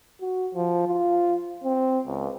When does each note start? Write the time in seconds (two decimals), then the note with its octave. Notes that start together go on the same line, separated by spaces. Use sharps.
0.21 F#4
0.55 F3
0.87 F4
1.64 C4
2.07 C#2